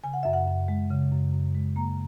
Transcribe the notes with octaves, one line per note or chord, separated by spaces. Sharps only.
C#3 G#5
F#5
F#2 E5
F#5
F#2
G#3
C#3
F#2
F#2
G#3
A#3 A#5